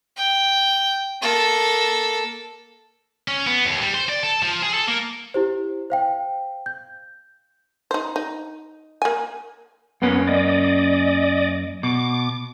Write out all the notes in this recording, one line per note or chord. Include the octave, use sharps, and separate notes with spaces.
G5
A#3 A4
C#4
B3
D#2
G3
C5
D5
A4
F3
G#4
A4
A#3
E4 G4 C5
C5 F5 G5
G6
D#4 C5
D#4
A#3 G#5
F#2 A#3 B3 C#4
D5 D#5
B2 D6